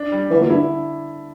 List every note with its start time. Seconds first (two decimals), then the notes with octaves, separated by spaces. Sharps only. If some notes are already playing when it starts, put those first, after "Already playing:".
Already playing: D4
0.12 G3
0.30 D3 E3
0.41 A#2
0.49 G2 E4